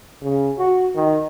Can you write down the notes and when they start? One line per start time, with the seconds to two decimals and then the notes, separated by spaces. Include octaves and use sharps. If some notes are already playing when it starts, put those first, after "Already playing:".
0.22 C#3
0.59 F#4
0.96 D#3